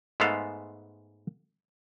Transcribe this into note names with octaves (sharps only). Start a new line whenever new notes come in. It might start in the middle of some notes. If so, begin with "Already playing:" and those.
G#2 G#3 A3 B3 A4 F5